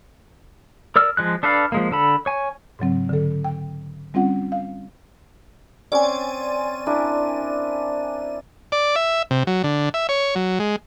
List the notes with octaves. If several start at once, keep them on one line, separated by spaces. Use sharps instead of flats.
A#4 D5 E6 F6
F3 G#3 F#6
D4 A4 B4 D5 F5
F3 G#3 A#3
D3 A4 B5
C#5 G#5
G#2 C#3 F#3 C4
D3 A4
G5
G3 C4 C#4 F4 F#5
F5
C4 C#4 C5 D5 G#5
D4 E4 A#4
D5
E5
C3
F#3
D3
E5
C#5
F#3
G#3